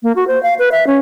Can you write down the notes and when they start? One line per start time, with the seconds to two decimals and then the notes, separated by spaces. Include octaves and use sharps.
0.03 A#3
0.16 F#4
0.27 C5
0.43 F5
0.59 B4
0.72 E5
0.87 C#4